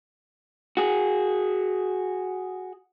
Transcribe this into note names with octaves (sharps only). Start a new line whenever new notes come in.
F#4 G#4